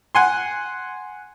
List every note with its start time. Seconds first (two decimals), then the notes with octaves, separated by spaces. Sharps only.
0.15 F#5 G#5 C6